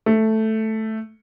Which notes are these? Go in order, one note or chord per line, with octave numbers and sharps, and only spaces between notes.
A3